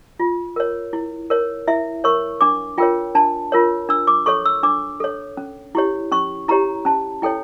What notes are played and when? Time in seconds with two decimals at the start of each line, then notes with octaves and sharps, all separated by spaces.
0.20 F4
0.56 A#4 C#5
0.93 E4
1.30 A#4 C#5
1.68 E4 E5
2.04 A#4 C#5 C#6
2.41 D4 D6
2.78 F4 A#4 C#5 G5
3.15 D4 A5
3.52 F4 A#4 C#5
3.89 D4 E6
4.07 D6
4.26 A4 C#5 C#6
4.45 E6
4.63 D4 D6
5.00 A4 C#5
5.37 C#4
5.75 E4 G4 C#5
6.12 C#4 C#6
6.48 E4 G4 C#5 A#5
6.85 C#4 A5
7.22 E4 A4 C#5 G5